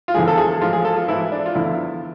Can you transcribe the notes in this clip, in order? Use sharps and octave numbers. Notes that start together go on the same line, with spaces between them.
F4
E2 D3 F3 G#4
A4
G#4
G#2 F3 F4
G#4
A4
F4
G#2 E3 E4
D4
F4
E2 D3 F3 E4